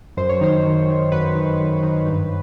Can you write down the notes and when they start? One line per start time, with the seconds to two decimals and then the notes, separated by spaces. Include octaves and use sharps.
0.17 F#2 C5
0.29 C#5
0.41 D#3 C5
0.65 F#2
0.89 D#3
1.12 F#2 B4
1.35 D#3
1.60 F#2
1.83 D#3
2.07 G2